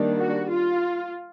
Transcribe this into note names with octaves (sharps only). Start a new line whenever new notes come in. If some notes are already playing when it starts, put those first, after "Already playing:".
Already playing: D#3 G3 A#3 D4
F#4
F4